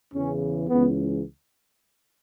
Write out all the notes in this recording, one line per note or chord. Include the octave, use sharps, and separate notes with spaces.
E2 C#3 E3 C#4
C#2 C#3 E3 B3